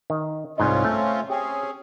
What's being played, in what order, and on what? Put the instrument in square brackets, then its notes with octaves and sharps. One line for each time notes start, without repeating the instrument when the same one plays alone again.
[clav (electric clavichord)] D#3
[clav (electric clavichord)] C2 G#2 D#5 [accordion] C4 C#4 F4
[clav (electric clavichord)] A3
[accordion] C4 C#4 G#4 [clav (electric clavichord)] G4